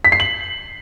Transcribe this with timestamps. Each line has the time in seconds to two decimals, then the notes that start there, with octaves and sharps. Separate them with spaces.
0.05 B6
0.12 C7
0.20 F#7